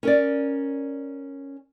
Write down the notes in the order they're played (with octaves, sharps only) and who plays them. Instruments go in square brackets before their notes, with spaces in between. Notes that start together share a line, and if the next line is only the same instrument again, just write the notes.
[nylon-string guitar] C#4 A#4 D5